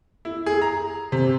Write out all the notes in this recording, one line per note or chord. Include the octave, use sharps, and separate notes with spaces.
E4
G#4
A#5
C3